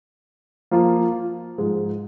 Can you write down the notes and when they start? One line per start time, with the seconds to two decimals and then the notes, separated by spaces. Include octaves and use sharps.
0.71 F3 A#3 F4
1.58 G#2 F3 G#3